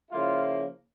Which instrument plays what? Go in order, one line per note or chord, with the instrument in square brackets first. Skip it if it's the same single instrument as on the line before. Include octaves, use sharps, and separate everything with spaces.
[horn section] C#3 F3 A#3 E4 F4